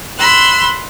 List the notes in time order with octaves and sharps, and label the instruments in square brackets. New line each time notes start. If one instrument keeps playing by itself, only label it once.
[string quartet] B5 C6 E6 F#6